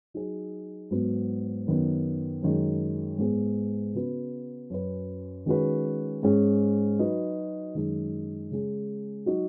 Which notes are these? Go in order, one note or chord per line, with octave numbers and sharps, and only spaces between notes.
F#3 D#4 G#4
G#2 F#3 B3
F#2 D#3 B3
F#2 D#3 G#3
G#2 G#3 B3 G#4
C#3 B3 F#4 B4
F#2 F#3 C#4 B4
D#3 G#3 C#4 F#4 B4
G#2 G#3 C#4 G#4
F#3 D#4 F#4 B4
F#2 D#3 G#3 D#4
C#3 G#3 C#4
F#3 D#4 F#4